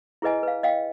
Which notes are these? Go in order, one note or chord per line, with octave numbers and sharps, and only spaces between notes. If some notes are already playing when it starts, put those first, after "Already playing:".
E4 G#4 B4 D#5 G#5
B4 F5
D#5 F5 G5